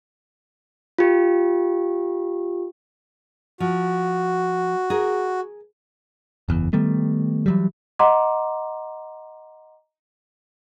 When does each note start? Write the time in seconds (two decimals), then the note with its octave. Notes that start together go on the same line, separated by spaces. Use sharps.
0.98 F4 G4
3.60 F3 F#4
4.90 G#4 A#4
6.49 F#1 E2
6.73 D#3 G3 A3 B3
7.46 E3 F#3 G3
7.99 D#5 F#5 A#5 C6 D6